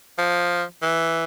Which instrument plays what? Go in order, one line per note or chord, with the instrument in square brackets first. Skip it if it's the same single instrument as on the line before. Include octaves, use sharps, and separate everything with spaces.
[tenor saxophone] F3
E3